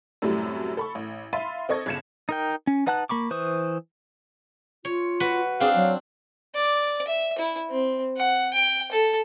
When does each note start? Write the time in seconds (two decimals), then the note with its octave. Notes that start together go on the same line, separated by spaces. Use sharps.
0.22 F#2 A2 C3 F#3 G3 A3
0.77 A4 B5 C#6
0.95 A1
1.33 E5 F5 B5 C6 A6 D#7
1.69 C4 A4 D#5 C#6 G#6
1.86 G1 C#3 G#6 C#7 E7
2.29 D#4 A#4 G5
2.67 C#4
2.87 D#4 B4 F#5 A5 F#6
3.09 A#3 B5 C#6 D6
3.31 E3 B4 C5 C#6 D#6
4.85 F4 C#5
5.20 F#4 B4
5.60 C4 D4 G#4 F5
5.75 F#3
6.55 D5
7.07 E5
7.38 E4
7.70 C4
8.17 F#5
8.54 G5
8.91 A4